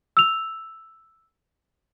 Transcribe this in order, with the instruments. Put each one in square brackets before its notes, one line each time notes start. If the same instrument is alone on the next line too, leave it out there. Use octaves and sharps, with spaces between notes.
[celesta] E6 F7